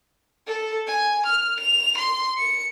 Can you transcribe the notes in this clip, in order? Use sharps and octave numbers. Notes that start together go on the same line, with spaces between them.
A4
G#5
F6
F7
C6
C#7